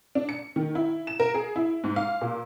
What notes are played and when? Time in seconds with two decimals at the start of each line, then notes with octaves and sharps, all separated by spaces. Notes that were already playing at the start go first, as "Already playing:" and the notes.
0.15 D4
0.29 C#7
0.56 D#3
0.75 E4
1.07 E7
1.20 A#4
1.34 G#4
1.56 E4
1.84 G#2
1.96 F5
2.21 A#2